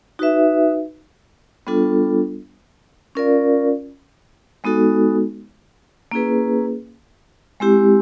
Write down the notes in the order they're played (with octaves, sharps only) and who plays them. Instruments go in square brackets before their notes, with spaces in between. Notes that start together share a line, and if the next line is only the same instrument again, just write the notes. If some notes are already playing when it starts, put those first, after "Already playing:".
[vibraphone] D#4 F#4 B4 E5
G3 B3 D4 F4 A4
C#4 F4 A#4 D5 F5
G#3 B3 D#4 F#4 A4
A#3 C#4 E4 G#4 B4
G#3 C4 E4 G4